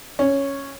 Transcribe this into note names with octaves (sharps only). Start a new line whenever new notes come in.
C#4